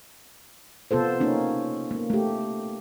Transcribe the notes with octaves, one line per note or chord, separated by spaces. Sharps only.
C3 B3 F4 A4 C5
A#3 C#4 D#4
A#3 B3
A3 G4